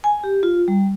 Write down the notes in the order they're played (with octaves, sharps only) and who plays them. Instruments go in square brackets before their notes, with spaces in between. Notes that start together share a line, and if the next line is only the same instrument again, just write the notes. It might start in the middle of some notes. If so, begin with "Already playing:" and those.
[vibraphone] G#5
G4
F4
G3